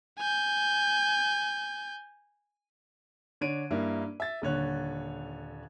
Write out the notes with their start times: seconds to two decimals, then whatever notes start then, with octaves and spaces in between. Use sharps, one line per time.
0.19 G#5 G6
3.41 D3 D4 C#5 D7 D#7
3.71 G2 A#3 E4
4.20 E5 A6
4.42 D#1 D3 C#5 F#6